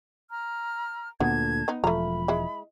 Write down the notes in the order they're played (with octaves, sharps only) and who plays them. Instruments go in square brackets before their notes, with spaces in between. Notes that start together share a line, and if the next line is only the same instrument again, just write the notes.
[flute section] A#5 F6
[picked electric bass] D2 A#2 D3 [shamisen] B3 [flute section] A5 G#6
[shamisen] B3 D#4
[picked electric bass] E1 F3 [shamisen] A3 A#5 [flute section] B5
[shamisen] G#3 E4